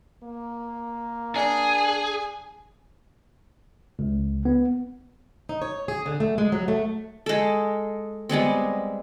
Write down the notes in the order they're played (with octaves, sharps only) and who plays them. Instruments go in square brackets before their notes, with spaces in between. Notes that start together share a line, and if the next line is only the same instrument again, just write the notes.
[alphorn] A#3
[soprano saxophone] D4 [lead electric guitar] G#4 [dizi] G#5
[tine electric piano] C#2
B3
[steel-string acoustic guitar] D#4
C#5
G#4
D3
A3
G#3
F#3
A3
[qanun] G#3 A4
G3 G#3 B3 C4